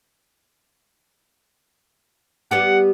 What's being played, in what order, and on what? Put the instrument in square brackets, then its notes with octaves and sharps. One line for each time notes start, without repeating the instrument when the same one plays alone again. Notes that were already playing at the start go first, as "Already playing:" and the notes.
[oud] G3 B3 G4 [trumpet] F#5